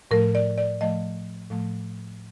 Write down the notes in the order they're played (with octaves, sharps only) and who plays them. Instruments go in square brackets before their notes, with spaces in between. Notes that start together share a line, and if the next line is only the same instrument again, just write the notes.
[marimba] A2 F3 A3 A#4
D5
D5
A2 F3 A3 D#5
A2 F3 A3